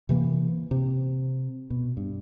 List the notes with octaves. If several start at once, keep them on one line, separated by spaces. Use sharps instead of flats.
C3 E3 A#3
C3
B2
G2